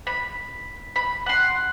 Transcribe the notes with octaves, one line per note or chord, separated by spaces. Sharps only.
B5
B5
F#5 C6